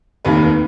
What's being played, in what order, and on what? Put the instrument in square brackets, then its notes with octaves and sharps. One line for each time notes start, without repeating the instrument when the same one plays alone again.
[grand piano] F1 D#2 D#3 A#3 B4